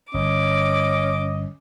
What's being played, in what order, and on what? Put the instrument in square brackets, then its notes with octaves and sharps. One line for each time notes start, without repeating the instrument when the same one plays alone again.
[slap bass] G1 [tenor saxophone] C#4 [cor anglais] D#5 [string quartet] D6